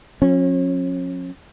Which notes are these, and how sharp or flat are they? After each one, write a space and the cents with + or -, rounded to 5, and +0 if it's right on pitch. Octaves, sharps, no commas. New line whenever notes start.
F3 +40 C#4 -35